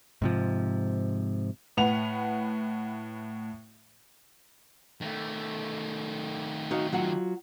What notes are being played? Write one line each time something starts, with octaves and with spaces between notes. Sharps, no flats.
G#2 C3 F3
A2 B4 F#5 F7
D#3 A3
D#4 F#4 F5
F#3 F4 F#5